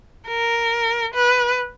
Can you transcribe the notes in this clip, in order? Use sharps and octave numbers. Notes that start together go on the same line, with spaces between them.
A#4
B4